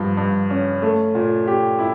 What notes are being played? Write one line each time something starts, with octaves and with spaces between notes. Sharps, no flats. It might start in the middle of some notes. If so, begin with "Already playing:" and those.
Already playing: G2 F3
G2
C#4
A3
A#2
G4
E4